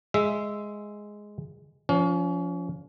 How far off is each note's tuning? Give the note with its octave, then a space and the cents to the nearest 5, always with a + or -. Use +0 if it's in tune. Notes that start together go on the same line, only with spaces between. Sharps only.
G#3 +0 E5 +0
F3 +0 C#4 +35